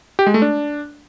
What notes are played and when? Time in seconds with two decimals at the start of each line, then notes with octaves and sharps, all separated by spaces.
0.19 G4
0.26 G#3
0.34 A3
0.42 D4